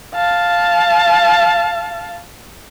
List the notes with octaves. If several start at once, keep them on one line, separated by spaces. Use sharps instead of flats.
F5 A5